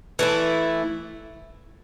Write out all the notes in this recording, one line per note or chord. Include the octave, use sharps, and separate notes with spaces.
E3 A3 E4